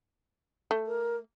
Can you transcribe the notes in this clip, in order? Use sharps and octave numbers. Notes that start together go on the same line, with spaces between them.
A3
A#4